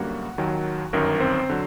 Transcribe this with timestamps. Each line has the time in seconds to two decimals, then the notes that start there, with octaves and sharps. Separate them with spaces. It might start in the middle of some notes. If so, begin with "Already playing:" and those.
Already playing: G1 F#2 D3 G3 A#3 F#4 F#5
0.38 D#2 D#3 F#3
0.93 G1 F#2 D#3 A#4
1.20 C4 C5
1.49 D3 F#3